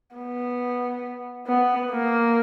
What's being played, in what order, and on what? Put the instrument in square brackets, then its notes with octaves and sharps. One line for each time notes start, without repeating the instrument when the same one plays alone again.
[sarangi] B3
B3
A#3